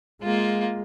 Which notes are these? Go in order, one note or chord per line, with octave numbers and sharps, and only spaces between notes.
G#3 A#3 F4